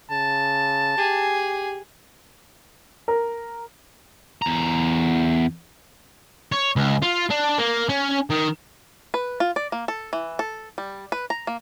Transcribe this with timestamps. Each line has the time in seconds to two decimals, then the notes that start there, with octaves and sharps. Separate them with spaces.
0.11 C#3 A5
0.97 G4 G#4
3.08 A#4
4.42 E2 A#5
6.52 C#5
6.76 C#2
7.02 F4
7.30 D4
7.58 A#3
7.89 C#4
8.30 D#3
9.14 B4
9.40 F4
9.56 D5
9.72 A#3
9.88 A4
10.13 E3
10.39 A4
10.78 G3
11.12 B4
11.30 A#5
11.47 A#3